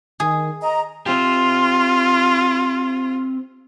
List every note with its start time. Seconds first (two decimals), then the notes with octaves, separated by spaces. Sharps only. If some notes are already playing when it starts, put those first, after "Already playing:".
0.20 D#3 G#4
0.62 D#5 A#5
1.06 C4 F4 G4